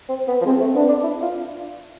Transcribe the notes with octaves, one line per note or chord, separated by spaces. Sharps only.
C4
B3
F3
G#3 C4
A3
B3 D4
D4
E4
F4